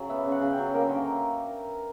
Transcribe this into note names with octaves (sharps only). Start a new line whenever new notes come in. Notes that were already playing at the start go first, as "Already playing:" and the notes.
Already playing: C#3 F#3 D5
B3 E5
C#3
F#5
C#3
G5
F#3
A#3 A#4
D3